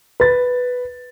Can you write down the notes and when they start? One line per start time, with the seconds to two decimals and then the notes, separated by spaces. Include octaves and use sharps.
0.20 B4 A6